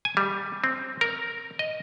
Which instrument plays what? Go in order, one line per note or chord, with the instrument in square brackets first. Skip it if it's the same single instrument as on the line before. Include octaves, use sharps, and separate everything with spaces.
[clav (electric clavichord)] G#5
G3
C4
A#4
D#5